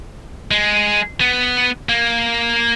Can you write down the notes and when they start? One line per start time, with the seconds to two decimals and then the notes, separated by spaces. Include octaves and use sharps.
0.51 G#3
1.20 B3
1.89 A#3